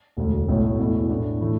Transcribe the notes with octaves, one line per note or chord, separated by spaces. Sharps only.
E1 D2 D3
B1 A2 A3
E2 B2 A3 E4
A2 A3 D4
A2 E3 A3